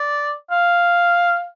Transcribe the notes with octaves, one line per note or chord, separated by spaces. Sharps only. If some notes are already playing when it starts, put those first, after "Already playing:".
Already playing: D5
F5